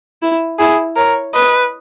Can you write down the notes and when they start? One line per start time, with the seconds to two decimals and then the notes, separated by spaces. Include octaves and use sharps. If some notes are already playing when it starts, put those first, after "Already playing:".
0.22 E4
0.59 E4 G#4
0.96 A#4 C#5
1.34 B4 D#5